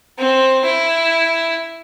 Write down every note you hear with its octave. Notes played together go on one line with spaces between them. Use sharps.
C4
E4